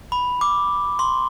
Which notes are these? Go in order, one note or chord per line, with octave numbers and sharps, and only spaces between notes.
B5
D6
C6